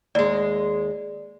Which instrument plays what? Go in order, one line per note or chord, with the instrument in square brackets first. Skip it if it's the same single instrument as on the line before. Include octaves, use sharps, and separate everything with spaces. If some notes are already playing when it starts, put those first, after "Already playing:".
[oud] D#2 G#3 [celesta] D5